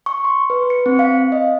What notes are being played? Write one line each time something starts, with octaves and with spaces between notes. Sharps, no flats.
C#6
C6
B4
C#7
C4
F5
D#5